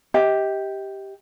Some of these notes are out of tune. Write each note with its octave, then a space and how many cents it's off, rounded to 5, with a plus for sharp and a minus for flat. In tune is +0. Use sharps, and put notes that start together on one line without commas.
G4 +0 D#5 +40